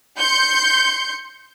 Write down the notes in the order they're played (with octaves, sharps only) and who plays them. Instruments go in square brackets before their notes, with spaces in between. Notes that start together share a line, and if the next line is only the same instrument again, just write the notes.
[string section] C6 G6 C#7